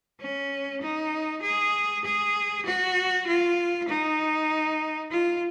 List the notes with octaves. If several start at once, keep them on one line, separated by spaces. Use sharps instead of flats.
C#4
D#4
G#4
G#4
F#4
F4
D#4
F4